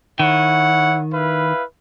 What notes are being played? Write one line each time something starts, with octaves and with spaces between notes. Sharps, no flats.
D#3 E4 C#5 F#5
E4 B4 F5